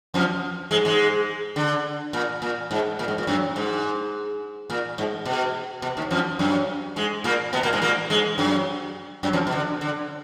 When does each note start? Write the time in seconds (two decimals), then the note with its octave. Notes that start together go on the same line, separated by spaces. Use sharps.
0.14 F2 F3
0.71 G#2 G#3
0.85 G#2 G#3
1.56 D3
2.13 A#2
2.42 A#2
2.71 G#2
2.99 A#2
3.08 G#2
3.18 A#2
3.27 F#2 F#3
3.56 G#2
4.70 A#2
4.98 G#2
5.25 B2
5.82 B2
5.97 D#2 D#3
6.11 F2 F3
6.39 F#2 F#3
6.96 G#2 G#3
7.24 A#2 A#3
7.53 B2 B3
7.63 A#2 A#3
7.73 G#2 G#3
7.82 A#2 A#3
8.10 G#2 G#3
8.38 F#2 F#3
9.23 F#2 F#3
9.33 F2 F3
9.47 B2
9.52 D3
9.81 D3